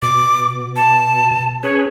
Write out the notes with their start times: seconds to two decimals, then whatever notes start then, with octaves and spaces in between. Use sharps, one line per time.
0.02 B2 D6
0.76 A5
1.63 C#4 G#4 B4 C#5